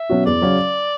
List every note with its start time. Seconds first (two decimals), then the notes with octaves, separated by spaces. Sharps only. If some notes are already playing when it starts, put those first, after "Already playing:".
Already playing: E5
0.10 B2 F#3 C#4 F#4
0.26 E2 D5
0.42 C#3 F#3 C#4